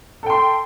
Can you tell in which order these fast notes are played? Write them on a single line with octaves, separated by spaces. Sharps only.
A4 G5 C6